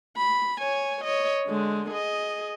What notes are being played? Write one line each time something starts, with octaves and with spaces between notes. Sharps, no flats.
B5
C#5 G#5
C#5 D#5
D3 G#3
G#4 D#5